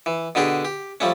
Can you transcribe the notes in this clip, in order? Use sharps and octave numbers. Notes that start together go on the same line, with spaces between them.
E3
B2 D3 D4 G4 G#4
G4
F3 G3 A3 C#4